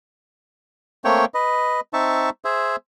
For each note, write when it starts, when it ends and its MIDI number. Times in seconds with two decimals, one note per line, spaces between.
1.05 1.25 57
1.05 1.25 58
1.05 1.25 60
1.05 1.25 73
1.05 1.25 79
1.34 1.80 71
1.34 1.80 75
1.93 2.30 60
1.93 2.30 63
1.93 2.30 76
1.93 2.30 81
1.93 2.30 85
2.45 2.76 68
2.45 2.76 72
2.45 2.76 76